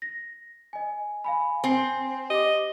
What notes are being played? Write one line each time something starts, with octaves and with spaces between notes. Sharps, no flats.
A#6
D#5 G#5
F5 G#5 B5
C4 G#5
G4 D#5 D6